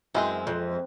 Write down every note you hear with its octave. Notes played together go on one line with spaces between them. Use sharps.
F#2 E3 G#3 C4
F2